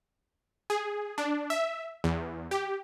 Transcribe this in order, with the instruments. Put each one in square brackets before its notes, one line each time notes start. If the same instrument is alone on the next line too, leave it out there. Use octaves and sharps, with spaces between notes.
[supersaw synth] G#4
D4
E5
E2
G4